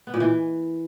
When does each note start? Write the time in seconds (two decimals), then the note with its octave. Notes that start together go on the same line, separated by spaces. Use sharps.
0.07 B3
0.14 A#2
0.20 E3